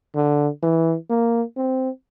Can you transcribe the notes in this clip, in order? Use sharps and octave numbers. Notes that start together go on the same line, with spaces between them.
D3
E3
A#3
C4